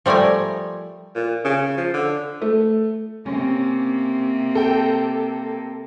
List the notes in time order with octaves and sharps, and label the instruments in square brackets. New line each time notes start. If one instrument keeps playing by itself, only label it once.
[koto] F3 G3 A3 A#4 G#5
[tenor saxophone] A#2
C#3
F3
D3
[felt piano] A3
[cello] C3 A#3 [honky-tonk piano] C#4
[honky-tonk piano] A4 G5